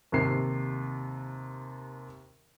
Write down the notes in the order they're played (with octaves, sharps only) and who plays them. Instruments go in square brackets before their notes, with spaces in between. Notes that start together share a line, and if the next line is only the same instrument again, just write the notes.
[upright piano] D#2 C3 C7